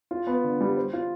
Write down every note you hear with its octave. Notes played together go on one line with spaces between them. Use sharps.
F4
B3
D3
G3
C5
F4